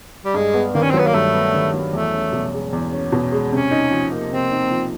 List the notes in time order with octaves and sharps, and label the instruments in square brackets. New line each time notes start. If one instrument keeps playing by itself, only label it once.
[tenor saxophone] G3
[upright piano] G2 [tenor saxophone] G#3
[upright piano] B3
[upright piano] D#3 [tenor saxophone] A#3
[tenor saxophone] C#4
C4
[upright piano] F#3 [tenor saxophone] B3
[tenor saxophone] A#3
[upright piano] G2 [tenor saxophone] A3
[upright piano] B3
D#3
F#3
[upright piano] E2 [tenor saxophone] A3
[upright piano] C#4
B2
G#3
E2
C#4
B2
G#3
[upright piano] C3 [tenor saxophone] C#4
[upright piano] D#4
F3
A#3
[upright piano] C3 [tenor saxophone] C4
[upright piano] D#4
F3